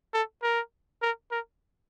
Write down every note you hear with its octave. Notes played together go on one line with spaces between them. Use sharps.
A4
A#4
A#4
A#4